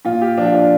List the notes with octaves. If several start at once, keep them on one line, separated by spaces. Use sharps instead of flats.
A#2 F4
G4
F3 D4
F4
D4